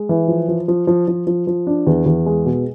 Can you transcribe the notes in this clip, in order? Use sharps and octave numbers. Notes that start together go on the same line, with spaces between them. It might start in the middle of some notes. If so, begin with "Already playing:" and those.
Already playing: G#3
E3
F3
F3
F3
F3
F3
F3
F3
D4
E2
E2
G#3
B2